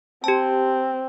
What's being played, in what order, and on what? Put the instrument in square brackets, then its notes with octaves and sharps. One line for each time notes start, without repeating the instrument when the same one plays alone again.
[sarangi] C4 [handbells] G4 A5